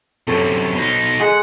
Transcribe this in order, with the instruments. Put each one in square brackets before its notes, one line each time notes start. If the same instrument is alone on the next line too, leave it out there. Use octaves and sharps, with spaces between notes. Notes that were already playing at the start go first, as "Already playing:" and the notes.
[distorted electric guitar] F#2 C3 [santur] A4 C#5
[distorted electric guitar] B2 D#4 [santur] C5
[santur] G#3 G#5 [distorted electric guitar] F#5